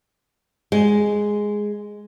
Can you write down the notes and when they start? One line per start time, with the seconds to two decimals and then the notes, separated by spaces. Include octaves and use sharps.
0.72 G#3